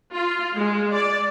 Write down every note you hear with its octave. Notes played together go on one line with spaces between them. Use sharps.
F4
G#3
D5